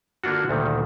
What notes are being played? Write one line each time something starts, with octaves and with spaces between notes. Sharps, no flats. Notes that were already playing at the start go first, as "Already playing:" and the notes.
D3 A#3 D4 F4 F#4
D2 A#2 D#3 G3